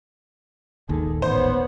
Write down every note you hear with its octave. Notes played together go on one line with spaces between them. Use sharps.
D#1 G#1 D#2 D#3 G#4 A4
A1 B3 C5 C#5